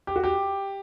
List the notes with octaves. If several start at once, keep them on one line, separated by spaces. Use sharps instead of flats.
G4
F#4
G4